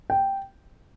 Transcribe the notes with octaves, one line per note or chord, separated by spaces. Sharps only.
G5